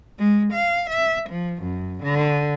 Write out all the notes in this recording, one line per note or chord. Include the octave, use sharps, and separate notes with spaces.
G#3
F5
E5
F3
F#2
D3